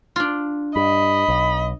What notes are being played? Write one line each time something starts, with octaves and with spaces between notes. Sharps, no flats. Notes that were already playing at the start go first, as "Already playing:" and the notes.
D4 F4
G2 D#5 B5
B1